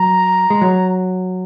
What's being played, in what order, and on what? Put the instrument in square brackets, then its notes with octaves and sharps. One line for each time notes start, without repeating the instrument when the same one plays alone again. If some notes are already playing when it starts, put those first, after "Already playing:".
Already playing: [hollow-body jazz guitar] F#3 [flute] A#5
[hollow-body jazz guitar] G#3
F#3